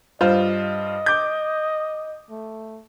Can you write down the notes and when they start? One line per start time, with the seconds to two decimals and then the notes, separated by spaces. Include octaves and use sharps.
0.21 G2 F4 C5 D#5
1.06 D6 G6
2.30 A3